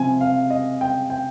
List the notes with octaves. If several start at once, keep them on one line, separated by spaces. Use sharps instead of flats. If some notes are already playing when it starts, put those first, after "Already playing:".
Already playing: C3 F3 C4 G#5
F5
D#5
G5
G5